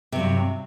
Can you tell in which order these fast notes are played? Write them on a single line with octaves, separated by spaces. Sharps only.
C3 F#3 G2